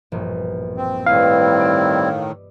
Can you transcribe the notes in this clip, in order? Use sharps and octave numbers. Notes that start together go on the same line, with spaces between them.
E1 A#1 G2
C4
A2 D#3 G3 C4 E4 B4 D#5 F5
D5 E6